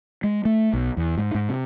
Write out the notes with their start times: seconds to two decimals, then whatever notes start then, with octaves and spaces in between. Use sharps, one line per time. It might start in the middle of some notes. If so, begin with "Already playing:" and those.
0.23 G#3
0.45 A3
0.73 B1
0.97 E2
1.18 G#2
1.35 G#2
1.49 C3